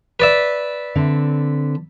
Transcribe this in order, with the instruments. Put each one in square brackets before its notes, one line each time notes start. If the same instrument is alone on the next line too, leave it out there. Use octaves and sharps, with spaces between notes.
[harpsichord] B4 D5 E5
[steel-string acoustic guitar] D3 C4